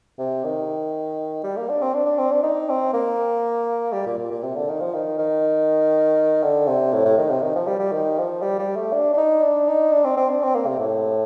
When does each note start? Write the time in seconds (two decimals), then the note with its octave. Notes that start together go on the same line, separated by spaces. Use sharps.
0.19 C3
0.44 D#3
1.43 G3
1.57 A#3
1.69 D4
1.82 C4
1.94 D4
2.06 D4
2.18 C4
2.31 D4
2.43 D#4
2.69 C4
2.93 A#3
3.93 G3
4.06 A#2
4.18 A#2
4.31 A#2
4.43 C3
4.56 D3
4.68 D#3
4.81 F3
4.94 D#3
5.19 D#3
6.43 D3
6.67 C3
6.93 A2
7.05 A2
7.18 D#3
7.30 C3
7.42 D#3
7.55 F3
7.68 G3
7.80 G3
7.92 D#3
8.18 F3
8.42 G3
8.59 G3
8.76 A3
8.93 D4
9.13 D4
9.17 D#4
9.42 D4
9.68 D#4
9.92 D4
10.04 C4
10.17 C4
10.29 D4
10.43 C4
10.55 A#3
10.67 C3
10.79 A2